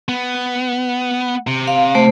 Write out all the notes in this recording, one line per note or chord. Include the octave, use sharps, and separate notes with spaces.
B3
C3
F5
A3 C5